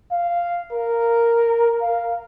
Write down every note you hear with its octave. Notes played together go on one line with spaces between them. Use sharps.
F5
A#4
F5